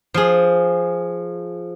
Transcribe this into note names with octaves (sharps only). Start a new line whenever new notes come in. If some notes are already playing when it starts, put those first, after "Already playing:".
F3 G#4